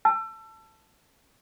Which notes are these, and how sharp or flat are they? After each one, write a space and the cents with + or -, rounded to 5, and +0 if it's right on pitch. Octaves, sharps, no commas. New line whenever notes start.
A5 +0 E6 +30